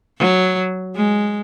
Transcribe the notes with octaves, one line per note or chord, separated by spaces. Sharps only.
F#3
G#3